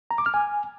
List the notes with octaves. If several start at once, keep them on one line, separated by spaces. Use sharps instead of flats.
A#5
D6
F6
G#5